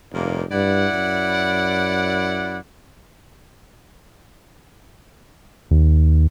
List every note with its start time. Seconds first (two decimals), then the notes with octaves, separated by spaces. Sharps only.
0.13 F1 G2 A#3 D#4
0.51 G2 E4 D5 F#5
0.94 F#2
5.71 D#2